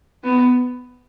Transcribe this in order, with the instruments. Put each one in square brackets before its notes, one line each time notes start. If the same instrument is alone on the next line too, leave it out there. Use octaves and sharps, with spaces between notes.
[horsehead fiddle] B3